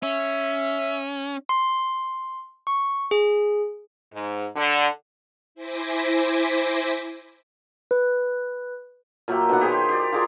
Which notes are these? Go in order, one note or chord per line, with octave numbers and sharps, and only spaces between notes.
C#4 E5
C6
C#6
G#4
G#2
D3
E4 C5 G#5 D6 A#6 B6
B4
A#2 F#3 G4 E5
B2 D#3 F#5
G4 G#4 C5
G4 D5
F4 G#4 A#4 D5